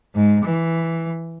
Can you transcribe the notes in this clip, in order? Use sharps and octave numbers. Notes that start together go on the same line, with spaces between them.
G#2
E3